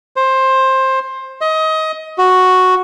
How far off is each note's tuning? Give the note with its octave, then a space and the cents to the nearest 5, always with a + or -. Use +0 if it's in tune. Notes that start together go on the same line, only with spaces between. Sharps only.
C5 +15
D#5 +25
F#4 +0